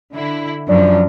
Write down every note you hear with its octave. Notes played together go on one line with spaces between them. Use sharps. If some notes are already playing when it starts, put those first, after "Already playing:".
D3 E4
F#2 F3 D4